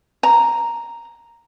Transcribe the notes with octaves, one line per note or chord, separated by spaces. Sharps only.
A#5